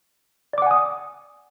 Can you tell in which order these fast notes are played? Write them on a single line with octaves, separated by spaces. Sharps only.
D5 D6 F#5 G#5 D#6